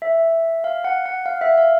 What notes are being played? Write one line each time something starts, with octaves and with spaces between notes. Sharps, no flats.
E5
F5
F#5
F#5
F5
E5
F5